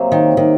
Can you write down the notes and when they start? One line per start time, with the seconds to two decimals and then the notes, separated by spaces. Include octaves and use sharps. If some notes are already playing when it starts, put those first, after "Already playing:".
Already playing: C3 F#3 A#3
0.12 D#3
0.37 D#3